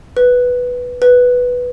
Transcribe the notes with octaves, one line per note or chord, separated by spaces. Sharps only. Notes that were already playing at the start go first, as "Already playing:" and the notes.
B4
B4